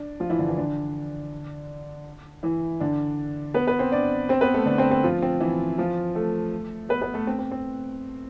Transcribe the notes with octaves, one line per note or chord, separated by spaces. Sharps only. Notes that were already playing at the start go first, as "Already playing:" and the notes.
Already playing: D4 D5
F3 F4
E3 E4
D3 D4
E3 E4
D3 D4
E3 E4
D3 D4
B3 B4
B3 B4
C4 C5
D4 D5
C4 C5
B3 B4
A3 A4
D3 D4
C4 C5
C4 C5
F3 F4
C4
E3 E4
F3 F4
A3 A4
B3 B4
B3 B4
A3 A4
C4
C4
C4